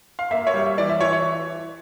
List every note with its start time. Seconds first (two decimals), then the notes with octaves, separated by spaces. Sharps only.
0.19 F5
0.31 A#3 E5
0.47 C#5
0.54 G3
0.66 E5
0.78 E3 D5
0.89 E5
1.01 E3 C#5
1.13 C#5